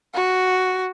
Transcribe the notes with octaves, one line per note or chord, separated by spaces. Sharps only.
F#4